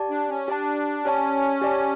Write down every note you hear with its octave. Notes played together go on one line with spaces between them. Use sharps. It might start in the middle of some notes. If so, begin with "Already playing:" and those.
Already playing: G4 D5 A5
D4
C#4
D4 G4 D5 A5
C#4 G4 D5 A5
G4 D5 A5